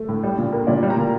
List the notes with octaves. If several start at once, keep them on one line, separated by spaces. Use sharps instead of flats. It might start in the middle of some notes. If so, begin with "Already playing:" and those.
Already playing: A3
A2
G3
A#2
A#3
A#2 D5
G3
A#5
A#2